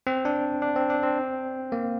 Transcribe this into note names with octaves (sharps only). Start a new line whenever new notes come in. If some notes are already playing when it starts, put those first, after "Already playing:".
C4
D4
D4
C4
D4
C4
A#3